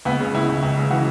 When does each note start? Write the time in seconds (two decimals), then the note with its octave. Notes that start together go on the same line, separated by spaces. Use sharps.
0.05 C#2 B3
0.21 C#3
0.34 C#2 E4
0.49 C#2
0.63 C#2
0.77 C#3
0.90 E3 F#4